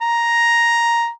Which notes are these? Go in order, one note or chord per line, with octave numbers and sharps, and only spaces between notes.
A#5